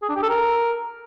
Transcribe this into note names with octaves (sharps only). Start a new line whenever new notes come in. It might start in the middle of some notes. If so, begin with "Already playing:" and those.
G#4
D4
G4
A4
A#4